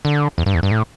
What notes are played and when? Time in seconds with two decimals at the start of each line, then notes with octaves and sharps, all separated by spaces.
0.05 D3
0.38 E2
0.46 G2
0.55 E2
0.63 G2
0.71 A2